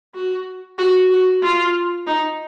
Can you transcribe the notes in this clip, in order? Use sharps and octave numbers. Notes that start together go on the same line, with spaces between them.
F#4
F#4
F#4
F4
D#4